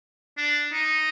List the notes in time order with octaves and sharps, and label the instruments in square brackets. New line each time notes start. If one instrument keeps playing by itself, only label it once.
[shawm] D4
D#4